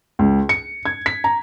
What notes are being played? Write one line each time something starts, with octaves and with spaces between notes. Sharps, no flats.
C#2
C#7
G#6
B6
A#5